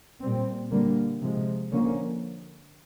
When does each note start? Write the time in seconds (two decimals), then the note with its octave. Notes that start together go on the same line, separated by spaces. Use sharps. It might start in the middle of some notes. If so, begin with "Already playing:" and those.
0.22 A#2 G3 C4
0.71 D3 G3 A#3
1.21 C3 F3 G#3
1.71 D3 F3 A#3 C#4